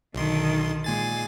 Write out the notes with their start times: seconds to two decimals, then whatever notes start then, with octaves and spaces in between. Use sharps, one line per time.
0.15 B1 D3 D#3 C6
0.84 A#2 G#3 G#5 A6